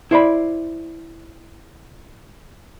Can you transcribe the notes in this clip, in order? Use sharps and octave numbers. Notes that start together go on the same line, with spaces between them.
E4 C5 D5 B5